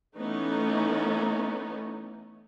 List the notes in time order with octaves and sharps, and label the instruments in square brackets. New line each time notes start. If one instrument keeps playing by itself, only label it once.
[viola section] E3 A3 B3 C#4 D#4